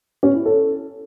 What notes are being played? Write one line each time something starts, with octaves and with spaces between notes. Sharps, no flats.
C#4
E4
A4